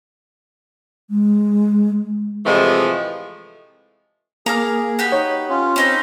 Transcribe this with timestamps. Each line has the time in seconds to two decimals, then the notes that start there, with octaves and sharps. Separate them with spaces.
1.10 G#3
2.46 A2 C3 E3 F3 G#3 A3
4.46 A#3 G#4 A#5 D6 F6
4.99 F#4 G4 B4
5.12 D#4 C#5
5.49 C#4 F4
5.76 C4 C#4 D#4 B4